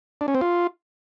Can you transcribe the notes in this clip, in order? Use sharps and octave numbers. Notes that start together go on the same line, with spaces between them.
D4
C#4
C4
F4